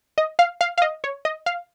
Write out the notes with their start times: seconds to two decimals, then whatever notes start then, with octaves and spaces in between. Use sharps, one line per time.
0.18 D#5
0.39 F5
0.61 F5
0.78 F5
0.82 D#5
1.04 C#5
1.25 D#5
1.46 F5